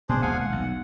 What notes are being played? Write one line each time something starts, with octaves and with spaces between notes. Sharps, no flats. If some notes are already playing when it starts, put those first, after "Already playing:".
B2 A#3 D4 G#4 C5
F1 D#2 G#3 F5 F#5 G#5
F#5
B1